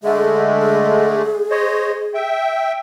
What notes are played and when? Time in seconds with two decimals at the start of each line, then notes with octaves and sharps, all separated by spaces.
0.04 D3 G#3 A3 G#4
0.62 G#4
1.51 C5 C#5 D#5
2.14 E5 G5